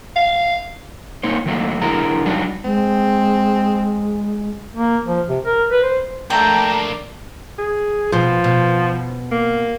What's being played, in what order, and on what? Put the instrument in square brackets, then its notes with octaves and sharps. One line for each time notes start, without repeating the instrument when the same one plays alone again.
[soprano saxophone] F5
[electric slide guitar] A#3 D#4 C5 C#5
D#3 F#3 A3 A#3
D3 E4 G#4 A#4 E5 A#5
F#3 G3 D4 D#4
[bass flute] G#3 [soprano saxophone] C4
[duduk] A#3
F3
C3
A#4
B4
C5
[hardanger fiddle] A3 [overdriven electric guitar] A#3 D4 [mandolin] G5 [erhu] A#5
[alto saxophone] G#4
[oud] B2 C4 [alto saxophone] F3
[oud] B2
[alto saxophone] A#3